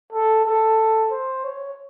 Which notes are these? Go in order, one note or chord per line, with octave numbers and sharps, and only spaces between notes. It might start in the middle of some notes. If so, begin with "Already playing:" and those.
A4
A4
C5
C#5